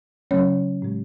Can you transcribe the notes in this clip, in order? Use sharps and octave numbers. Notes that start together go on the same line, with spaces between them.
C#3 F#3 A3 C#4 C#5
A2 G#3